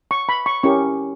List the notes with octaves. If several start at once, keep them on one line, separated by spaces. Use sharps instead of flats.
C#6
B5
C#6
C#4 E4 G4 A#4 C#6